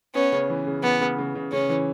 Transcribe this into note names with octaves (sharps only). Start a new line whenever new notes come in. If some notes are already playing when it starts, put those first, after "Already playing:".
B3 C#4
C#3
E3
C#3
E3 B3
C#3
C#3
C#3
C#3 C#4
E3